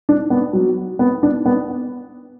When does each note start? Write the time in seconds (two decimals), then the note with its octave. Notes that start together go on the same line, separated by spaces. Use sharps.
0.09 D4
0.30 B3
0.53 F#3
0.99 B3
1.23 D4
1.46 B3